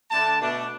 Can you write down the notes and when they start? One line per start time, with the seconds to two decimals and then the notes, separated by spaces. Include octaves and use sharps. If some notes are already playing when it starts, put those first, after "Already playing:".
0.11 D3 A3 D4 A5
0.40 B2 A3 D4